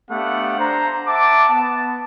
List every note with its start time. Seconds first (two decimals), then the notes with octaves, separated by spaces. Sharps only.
0.10 A3 B3 D4 G4 F5 F#5
0.58 D4 C5 A#5
1.07 E5 F#5 A5 D6
1.49 B3 A5